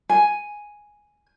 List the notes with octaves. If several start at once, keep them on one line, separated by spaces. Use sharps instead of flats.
G#5